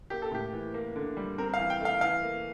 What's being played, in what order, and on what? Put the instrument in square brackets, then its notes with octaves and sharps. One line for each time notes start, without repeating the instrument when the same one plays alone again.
[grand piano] A#3 G4
A4
A2 G4
E3
A#3
D3
G3
C4 A#4
F5
E3
G5
A3 F5
E3 F5
A#3